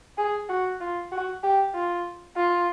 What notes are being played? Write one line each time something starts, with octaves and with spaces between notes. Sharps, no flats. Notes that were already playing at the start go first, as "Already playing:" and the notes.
G#4
F#4
F4
F#4
G4
F4
F4